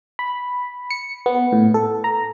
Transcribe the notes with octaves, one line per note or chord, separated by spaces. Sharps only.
B5
C#7
B3
A2
A4
A#5